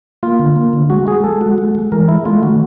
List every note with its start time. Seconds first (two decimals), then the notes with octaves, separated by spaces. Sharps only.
0.23 A#3 F4
0.39 D3
0.56 A#3
0.73 D3
0.90 G#3 F#4
1.07 G#3 G#4
1.24 G#3 A4
1.41 F#4
1.58 G#3
1.75 G#3
1.92 E3 A#4
2.08 G#3 E4
2.25 A3 F4
2.43 D#3 F#4